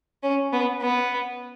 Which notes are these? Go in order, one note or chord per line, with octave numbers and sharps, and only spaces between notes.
C#4
B3
B3